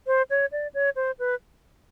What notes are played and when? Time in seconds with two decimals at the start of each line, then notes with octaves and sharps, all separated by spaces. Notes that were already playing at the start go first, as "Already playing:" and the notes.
0.07 C5
0.30 C#5
0.52 D5
0.74 C#5
0.96 C5
1.19 B4